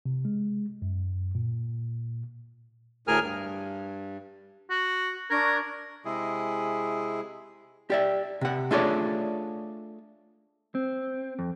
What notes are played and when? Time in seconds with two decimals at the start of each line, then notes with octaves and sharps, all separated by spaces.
0.06 C3
0.25 G#3
0.82 F#2
1.35 A#2
3.07 D2 A2 G#4 A#4 G#5 F6
3.22 G2
4.70 F#4
5.30 D4 A#4 C#6 G#6
6.05 C3 G#3 E4 G#4
7.90 G4 D5 E5
8.41 C3 F#5
8.71 A3 D4 F4 G#4 C#5 D5
10.75 C4
11.39 F2